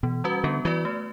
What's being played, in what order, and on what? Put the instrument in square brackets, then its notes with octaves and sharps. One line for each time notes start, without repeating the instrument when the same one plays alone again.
[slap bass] B2 [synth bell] E3
[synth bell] G3 C#4 F#4 B4
[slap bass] D3 [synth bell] B3
[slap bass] E3 [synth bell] F#4 B4 D5
[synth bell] A3